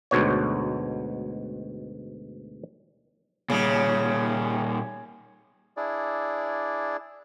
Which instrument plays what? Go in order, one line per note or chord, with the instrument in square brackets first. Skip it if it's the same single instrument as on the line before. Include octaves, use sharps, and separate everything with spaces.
[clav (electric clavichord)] D2 G#2 B2 C#5
[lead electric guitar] A#2 G3 [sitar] C#3
[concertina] D4 E4 G#4 D5